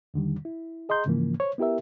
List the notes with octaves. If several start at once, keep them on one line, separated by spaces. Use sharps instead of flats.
E2 D3 D#3 G3
E4
G#4 D#5 A#5 C6 G6
G#2 C#3 E3 F3 A#3
C5 C#5
B3 E4 G4 A#4 E5